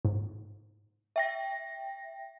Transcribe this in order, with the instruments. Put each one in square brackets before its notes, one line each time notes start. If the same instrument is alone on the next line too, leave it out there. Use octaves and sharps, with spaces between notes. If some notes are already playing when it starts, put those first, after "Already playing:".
[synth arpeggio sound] G#2
[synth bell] E5 G5 A#6